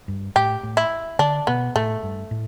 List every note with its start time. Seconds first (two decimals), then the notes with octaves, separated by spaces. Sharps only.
0.08 G2
0.36 A2 G4
0.63 A2
0.77 E4
1.19 D3 D4
1.47 B2 B3
1.75 A2 A3
2.03 G2
2.31 A2